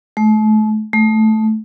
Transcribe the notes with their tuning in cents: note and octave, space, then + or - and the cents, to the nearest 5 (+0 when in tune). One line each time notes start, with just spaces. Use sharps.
A3 -35
A3 -10